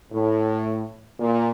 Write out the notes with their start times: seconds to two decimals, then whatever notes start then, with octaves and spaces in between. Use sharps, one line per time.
0.12 A2
1.20 A#2